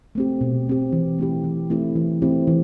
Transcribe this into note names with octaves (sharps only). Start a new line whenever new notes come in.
A3 C4 G4
B2
A3 C4 G4
E3
A3 C4 E4 G4
E3
A3 C4 E4 G4
E3
A3 C4 E4 G4
E3